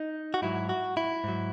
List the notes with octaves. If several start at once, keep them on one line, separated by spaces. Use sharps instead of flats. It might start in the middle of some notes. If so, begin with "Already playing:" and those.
Already playing: D#4
F#4
G#2 F#3 E4
F#4
E4
G#2 F#3